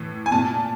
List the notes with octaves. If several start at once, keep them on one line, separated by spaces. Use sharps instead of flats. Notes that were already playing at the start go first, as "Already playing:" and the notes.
Already playing: A2 E3
G#5
A#2 A5